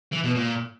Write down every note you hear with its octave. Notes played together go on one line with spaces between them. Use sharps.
E3
B2
A#2